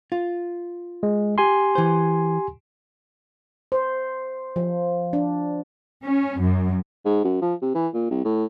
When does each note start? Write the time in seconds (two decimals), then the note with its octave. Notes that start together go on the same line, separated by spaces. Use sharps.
0.12 F4
1.03 G#3
1.38 G4 G#5 C6
1.75 E3 C5
3.72 C5
4.56 F3
5.13 D4
6.04 C#4
6.40 F#2
7.05 G#2
7.24 F#2
7.42 F3
7.62 C3
7.75 E3
7.94 A#2
8.11 C2
8.25 A2